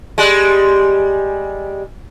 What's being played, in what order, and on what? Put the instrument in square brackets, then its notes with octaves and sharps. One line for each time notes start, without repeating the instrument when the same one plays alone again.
[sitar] G3 G#3